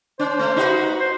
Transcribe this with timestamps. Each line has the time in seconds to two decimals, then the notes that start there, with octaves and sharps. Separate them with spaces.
0.19 C#4 C5
0.39 A3
0.56 D#4 F#4 B4
1.00 C5